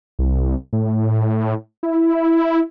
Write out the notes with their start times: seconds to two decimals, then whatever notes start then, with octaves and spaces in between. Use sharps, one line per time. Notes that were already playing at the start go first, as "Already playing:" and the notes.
0.19 C2
0.73 A2
1.83 E4